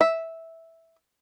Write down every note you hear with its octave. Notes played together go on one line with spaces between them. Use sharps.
E5